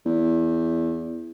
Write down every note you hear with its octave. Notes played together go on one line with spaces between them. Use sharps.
E2